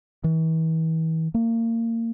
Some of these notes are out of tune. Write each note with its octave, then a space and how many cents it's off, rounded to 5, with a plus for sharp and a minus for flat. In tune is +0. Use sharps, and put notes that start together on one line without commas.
E3 -40
A#3 -30